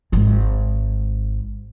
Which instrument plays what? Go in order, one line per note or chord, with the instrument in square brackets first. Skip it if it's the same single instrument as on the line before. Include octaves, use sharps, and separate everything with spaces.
[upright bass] G#1 G#3